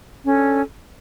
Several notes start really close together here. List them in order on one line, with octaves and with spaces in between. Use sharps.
C#4 A4 D4